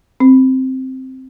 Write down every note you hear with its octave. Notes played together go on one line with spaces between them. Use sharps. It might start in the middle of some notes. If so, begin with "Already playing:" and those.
C4